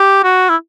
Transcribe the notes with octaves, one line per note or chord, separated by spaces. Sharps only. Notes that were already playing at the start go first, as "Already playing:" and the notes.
Already playing: G4
F#4
E4